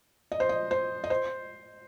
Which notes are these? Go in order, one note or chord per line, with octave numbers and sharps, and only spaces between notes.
D#5
C5
D#5
C5
D#5
C5